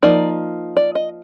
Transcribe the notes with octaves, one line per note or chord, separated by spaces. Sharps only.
F3 A#3 D#4 D5
D5
D#5